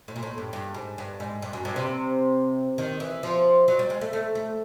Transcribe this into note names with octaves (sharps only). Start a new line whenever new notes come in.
A2
A#2
A2
G2
G2
G#2
G2
G#2
G2
F#2
G2
C3
D#3
E3
F3
F#3
G3
G#3
A3
A3
A3